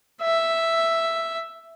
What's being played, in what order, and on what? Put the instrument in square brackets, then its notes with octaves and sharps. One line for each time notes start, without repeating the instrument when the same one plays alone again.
[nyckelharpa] E5